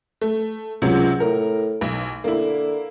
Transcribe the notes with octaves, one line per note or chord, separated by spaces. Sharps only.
A3
C#2 C3 F#3
A2 A#4
B1
D3 A#3 E4